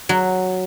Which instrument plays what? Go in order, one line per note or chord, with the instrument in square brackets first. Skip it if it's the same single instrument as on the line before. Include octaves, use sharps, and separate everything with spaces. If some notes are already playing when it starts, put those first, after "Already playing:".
[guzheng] F#3